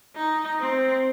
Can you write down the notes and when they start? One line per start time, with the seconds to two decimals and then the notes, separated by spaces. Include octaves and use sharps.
0.16 D#4
0.60 C4